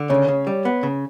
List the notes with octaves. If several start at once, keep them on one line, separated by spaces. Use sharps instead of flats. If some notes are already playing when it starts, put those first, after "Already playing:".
Already playing: D3
C#3 C#5
C#3
G3
B3
C#3